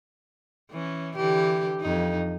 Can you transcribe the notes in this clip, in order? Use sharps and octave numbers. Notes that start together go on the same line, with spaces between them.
E3 C#4
D3 E3 G4
F2 D#4